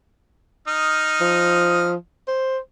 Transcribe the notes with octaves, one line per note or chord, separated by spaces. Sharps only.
D#4 D#6 F6
F3
C5